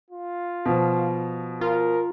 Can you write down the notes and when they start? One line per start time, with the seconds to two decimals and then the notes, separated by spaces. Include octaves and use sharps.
0.10 F4
0.66 B2 F3
1.61 F4 A#4